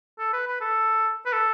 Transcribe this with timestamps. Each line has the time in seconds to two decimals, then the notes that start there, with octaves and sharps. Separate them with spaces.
0.19 A4
0.33 B4
0.48 B4
0.61 A4
1.26 B4
1.33 A4